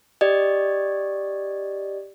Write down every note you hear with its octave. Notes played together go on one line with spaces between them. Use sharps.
G4 D5 D#5